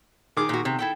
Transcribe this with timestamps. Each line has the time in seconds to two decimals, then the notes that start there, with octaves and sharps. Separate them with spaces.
0.37 D#3 G#4 D6
0.49 A#2 F#4
0.65 C3
0.79 E4 A4 G5